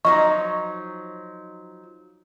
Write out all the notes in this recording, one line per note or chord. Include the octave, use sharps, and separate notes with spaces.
F3 F#3 D#4 D#5 C#6